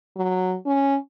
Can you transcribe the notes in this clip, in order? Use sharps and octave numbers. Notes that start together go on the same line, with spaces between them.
F#3
C#4